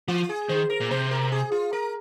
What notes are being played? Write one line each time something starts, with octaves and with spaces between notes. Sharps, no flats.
F3 F4
G#4
D#3 C5
A#4
A#2
C3 C5
A#4
G#4
F4
A#4